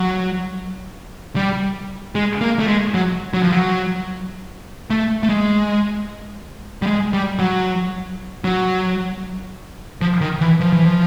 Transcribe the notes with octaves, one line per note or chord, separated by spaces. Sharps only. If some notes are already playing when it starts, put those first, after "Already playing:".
Already playing: F#3
G3
G#3
A#3
A3
G#3
F#3
F#3
F3
F#3
A3
A3
G#3
G3
G#3
G3
F#3
F#3
F3
D#3
E3
F3
E3
F3